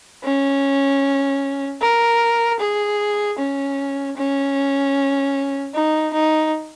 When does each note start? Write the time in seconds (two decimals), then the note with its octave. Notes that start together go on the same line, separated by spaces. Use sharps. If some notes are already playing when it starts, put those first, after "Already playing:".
0.24 C#4
1.81 A#4
2.60 G#4
3.39 C#4
4.17 C#4
5.74 D#4
6.14 D#4